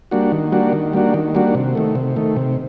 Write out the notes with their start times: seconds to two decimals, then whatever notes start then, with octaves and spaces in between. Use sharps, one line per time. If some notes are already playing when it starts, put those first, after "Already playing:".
0.11 G3 A#3 D4 F#4
0.32 D#3
0.52 G3 A#3 D4 F#4
0.73 D#3
0.93 G3 A#3 D4 F#4
1.14 D#3
1.35 G3 A#3 D4 F#4
1.55 C3
1.75 D#3 A3
1.95 C3
2.16 D#3 A3
2.37 C3